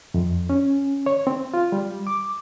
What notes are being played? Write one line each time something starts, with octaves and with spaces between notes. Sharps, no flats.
F2
C#4
C#5
C4
F4
G3
D6